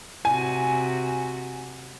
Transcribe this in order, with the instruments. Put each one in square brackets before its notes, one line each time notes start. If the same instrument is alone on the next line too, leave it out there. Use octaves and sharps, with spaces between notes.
[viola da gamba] C3 F#4 [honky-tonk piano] G#5